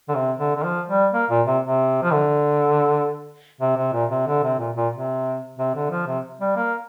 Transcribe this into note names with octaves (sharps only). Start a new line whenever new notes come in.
D3
C3
D3
D3
F3
G3
A#3
A#2
C3
C3
F3
D3
C3
C3
A#2
C3
D3
C3
A#2
A#2
C3
C3
D3
F3
C3
G3
A#3